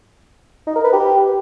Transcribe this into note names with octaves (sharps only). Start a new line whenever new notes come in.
D#4
A#4
B4
G4